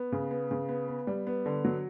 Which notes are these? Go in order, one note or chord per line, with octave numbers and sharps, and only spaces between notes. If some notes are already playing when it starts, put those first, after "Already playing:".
Already playing: B3
C#3
B3
C#3
B3
B3
G3
B3
D3
F#3